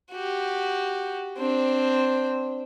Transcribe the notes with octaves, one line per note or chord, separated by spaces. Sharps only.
F#4 G4
C4 D4